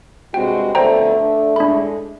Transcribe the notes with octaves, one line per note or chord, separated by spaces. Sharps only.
G2 C3 G#3 C4 F#4 G5
F2 B2 D3 A3 C5 G5 A#5
D3
A2 D3 G#3 D4 B5